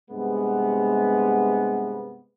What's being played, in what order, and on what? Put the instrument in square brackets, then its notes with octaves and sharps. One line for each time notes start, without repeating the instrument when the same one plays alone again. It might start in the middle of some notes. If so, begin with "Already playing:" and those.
[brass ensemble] G2 C3 G#3 B3